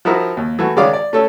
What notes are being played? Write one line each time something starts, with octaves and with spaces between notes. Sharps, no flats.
F3 D#4 E4 F#4 A#4
D#2
E3 A3 F#4
D#3 G#3 C#4 D5 F5 D6
D5
A3 C#4 A4